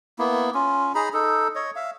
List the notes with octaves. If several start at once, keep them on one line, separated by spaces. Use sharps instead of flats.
A#3 B3 E4
C#4 F4
D#4 G#4 A#5 B5
D#4 A4
C#5 D#5
E5 F5